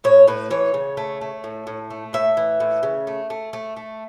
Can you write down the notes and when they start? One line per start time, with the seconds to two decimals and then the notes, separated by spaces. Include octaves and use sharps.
0.04 A2 C#5
0.27 A2 B4
0.51 E3 C#5
0.74 C#3
0.97 A3
1.21 A3
1.44 A2
1.67 A2
1.91 A3
2.13 A2 E5
2.37 E3
2.60 A2
2.83 C#3
3.07 A3
3.30 A3
3.53 A3
3.77 A3